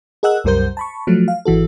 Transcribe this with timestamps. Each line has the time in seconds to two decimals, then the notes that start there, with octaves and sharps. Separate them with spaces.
0.23 G#4 A#4 D#5 F#5 E6 F#6
0.44 C2 F#2 G3 A#4 C5 G6
0.77 A5 B5 C#6
1.07 F3 F#3 A3
1.28 F5
1.45 G#1 E3 F#4 A4